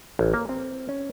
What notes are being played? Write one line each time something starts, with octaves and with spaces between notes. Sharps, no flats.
A1
A#3
C4
C#4